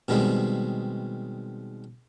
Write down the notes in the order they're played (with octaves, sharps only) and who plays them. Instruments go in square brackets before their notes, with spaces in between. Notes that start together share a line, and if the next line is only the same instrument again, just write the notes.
[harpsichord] B2 D#3 G3 G#3 C4